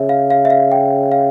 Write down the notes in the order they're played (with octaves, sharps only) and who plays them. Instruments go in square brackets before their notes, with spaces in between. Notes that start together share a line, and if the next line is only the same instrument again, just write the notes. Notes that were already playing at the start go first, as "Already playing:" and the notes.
Already playing: [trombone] C#3 [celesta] E5
[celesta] F5
F5
E5
F5
G5
F5